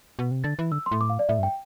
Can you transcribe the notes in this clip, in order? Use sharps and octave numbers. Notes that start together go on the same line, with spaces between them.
B2
C3
D3 A6
E3
D3 E6
C6
A2
D6
F5
D5
A2 E5
G2 G5